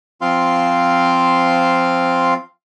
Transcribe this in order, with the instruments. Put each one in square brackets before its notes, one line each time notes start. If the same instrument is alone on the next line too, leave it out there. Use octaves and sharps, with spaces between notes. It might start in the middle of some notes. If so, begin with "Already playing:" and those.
[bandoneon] F3 C4 F4 F5 C6